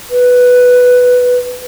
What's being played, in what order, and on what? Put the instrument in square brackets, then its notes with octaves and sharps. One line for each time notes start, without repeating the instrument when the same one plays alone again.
[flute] B4